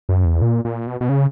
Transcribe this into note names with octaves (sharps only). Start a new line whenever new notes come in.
F#2
E2
A#2
A#2
B2
B2
C#3